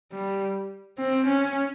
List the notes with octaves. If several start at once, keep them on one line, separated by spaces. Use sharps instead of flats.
G3
C4
C#4